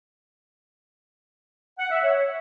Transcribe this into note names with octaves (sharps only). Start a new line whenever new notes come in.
F#5
E5
C#5